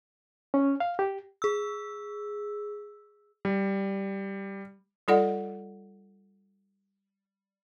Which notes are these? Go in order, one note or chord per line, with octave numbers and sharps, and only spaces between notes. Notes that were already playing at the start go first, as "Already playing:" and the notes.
C#4
F5
G4
G#4 E6
G3
G3 F4 A4 D5 D#5 F#5